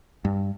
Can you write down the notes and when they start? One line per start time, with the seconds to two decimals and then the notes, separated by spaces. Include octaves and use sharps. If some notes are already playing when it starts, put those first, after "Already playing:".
0.25 G2